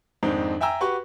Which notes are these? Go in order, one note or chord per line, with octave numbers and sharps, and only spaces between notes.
F2 G#2 D#3 C4 D4 D#4
E5 G5 G#5 A#5 E6
F#4 G4 B4 C#6